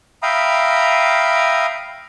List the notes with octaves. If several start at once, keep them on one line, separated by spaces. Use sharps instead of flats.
E5 F5 G5 A#5 B5 D#6